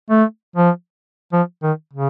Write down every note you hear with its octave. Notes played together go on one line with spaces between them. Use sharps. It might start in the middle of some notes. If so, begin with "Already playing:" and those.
A3
F3
F3
D#3
C#3